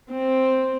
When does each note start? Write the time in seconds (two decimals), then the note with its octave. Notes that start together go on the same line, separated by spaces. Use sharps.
0.10 C4